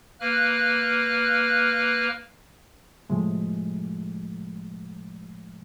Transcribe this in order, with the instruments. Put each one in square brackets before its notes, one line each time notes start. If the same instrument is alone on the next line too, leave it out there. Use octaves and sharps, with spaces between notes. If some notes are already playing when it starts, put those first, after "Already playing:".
[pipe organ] A#3 B4 F6 F#6
[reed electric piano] A2 C3 F3 G#3 A3